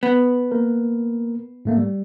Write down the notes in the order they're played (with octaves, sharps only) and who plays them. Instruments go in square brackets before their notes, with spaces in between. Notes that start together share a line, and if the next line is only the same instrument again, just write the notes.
[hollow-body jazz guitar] B3
[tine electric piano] A#3 A#4
G#2 A3 A#3
G3